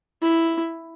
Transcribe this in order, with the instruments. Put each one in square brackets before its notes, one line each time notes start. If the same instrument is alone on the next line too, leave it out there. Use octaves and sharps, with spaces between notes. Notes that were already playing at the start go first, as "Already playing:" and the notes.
[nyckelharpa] E4